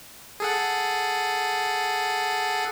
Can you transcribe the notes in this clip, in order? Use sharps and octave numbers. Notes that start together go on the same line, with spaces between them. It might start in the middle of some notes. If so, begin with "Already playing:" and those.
G#4 A4 F#5